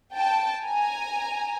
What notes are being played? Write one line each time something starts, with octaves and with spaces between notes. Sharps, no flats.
G5 A5
G#5 A#5